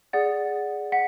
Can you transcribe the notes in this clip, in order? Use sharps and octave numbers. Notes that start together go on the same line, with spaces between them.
G#4 D5 F#5 A6
F#5 B6